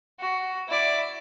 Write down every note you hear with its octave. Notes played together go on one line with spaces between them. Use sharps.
F#4
E4 D5